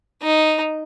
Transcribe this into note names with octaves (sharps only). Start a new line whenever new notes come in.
D#4